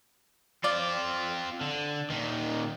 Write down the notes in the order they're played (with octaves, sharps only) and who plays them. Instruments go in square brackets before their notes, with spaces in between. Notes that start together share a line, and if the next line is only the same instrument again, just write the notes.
[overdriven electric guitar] C4 F4 [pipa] D5
[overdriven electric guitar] D3
A#2 D#3